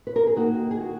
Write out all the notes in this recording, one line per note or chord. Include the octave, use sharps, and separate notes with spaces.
B4
A#4
G#4
D#3 A#3 D#4 F#4
G#4
F#4